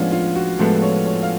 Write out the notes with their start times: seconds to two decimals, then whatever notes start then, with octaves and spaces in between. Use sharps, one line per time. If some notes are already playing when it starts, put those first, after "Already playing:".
Already playing: A2 F3 G#3 B3 C#4 D4 F4
0.12 F4
0.35 F#4
0.59 A2 F3 G#3 B3 A4
0.82 C#5
1.06 C#5
1.23 F5